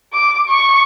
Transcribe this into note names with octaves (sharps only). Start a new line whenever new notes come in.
D6
C#6